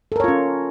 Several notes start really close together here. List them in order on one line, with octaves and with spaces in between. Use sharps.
A4 A#4 C#5 F4 C#4